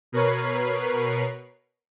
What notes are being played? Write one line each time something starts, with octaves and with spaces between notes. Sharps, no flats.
B2 A#4 B4 C#5 C7